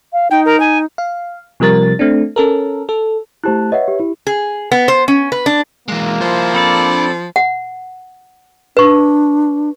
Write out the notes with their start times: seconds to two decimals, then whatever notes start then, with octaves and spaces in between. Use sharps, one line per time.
0.13 F5
0.31 D#4 G5
0.45 A#4
0.60 G#5
0.98 F5
1.60 C3 F3 G3 A#4 A6
1.99 A3 C4 D4
2.36 C#4 A4 A#4
2.89 A4
3.44 A3 E4 G4 C5 A5 F#6
3.72 B4 C#5 D#5 E5 F#5
3.88 G4
4.00 E4
4.27 G#4
4.71 B3
4.88 C5
5.08 C#4
5.32 B4
5.46 D4
5.88 E3 G#3 A#3
6.21 F3 E4 C5
6.55 C4 D4 A4 D5 B5
7.36 F#5
8.77 D4 B4 C#6